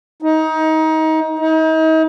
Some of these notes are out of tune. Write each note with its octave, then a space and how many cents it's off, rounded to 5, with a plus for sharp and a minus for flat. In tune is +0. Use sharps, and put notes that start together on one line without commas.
D#4 +25
D#4 +40